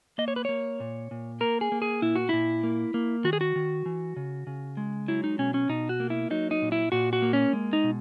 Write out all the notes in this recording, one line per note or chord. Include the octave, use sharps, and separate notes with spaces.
A#3 D#5
C#5
B4
A#3 C#5
A#2
A#2
A#3 A#4
G#4
A#3
G#4
A#2 E4
F#4
A#2 E4
A#3
A#3
D#3 F#4
G#4
F#4
D#3
E3
C#3
C#3
G#3
F#3 E4
D#4
B2 C#4
C#4
B2 D#4
F#4
A#3
E4
F#3 D#4
D#4
A#2
E4
A#2 F#4
F#4
A#3
C#4
G#3
D#4
B2